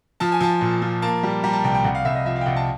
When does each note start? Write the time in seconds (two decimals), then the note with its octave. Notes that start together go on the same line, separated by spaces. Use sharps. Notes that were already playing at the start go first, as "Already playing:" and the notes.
0.20 F3 A5
0.32 G#5
0.41 F3 A5
0.61 A#2
0.82 F3
1.02 A#3 A5
1.23 G3
1.43 G3 A#5
1.53 A5
1.64 C2 G5
1.74 G5
1.84 C2 F#5
1.95 F5
2.05 C2 E5
2.15 D#5
2.26 F3 E5
2.36 F5
2.41 G5
2.46 C2 F#5
2.56 A5